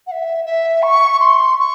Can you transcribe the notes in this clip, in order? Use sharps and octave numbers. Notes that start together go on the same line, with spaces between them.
F#5
E5
E5
C#6
C6
C#6